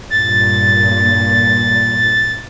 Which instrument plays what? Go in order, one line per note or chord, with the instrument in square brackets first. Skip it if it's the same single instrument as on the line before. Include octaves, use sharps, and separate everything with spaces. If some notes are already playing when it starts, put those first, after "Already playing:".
[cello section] G2 A#2 [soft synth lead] A6